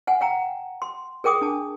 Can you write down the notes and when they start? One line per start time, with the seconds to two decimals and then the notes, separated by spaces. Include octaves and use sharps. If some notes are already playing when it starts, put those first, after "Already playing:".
0.07 F#5 G#5
0.21 F5 G5 A#5
0.82 C6
1.24 G#4 A#4 G5 D6 D#6
1.41 D4 A5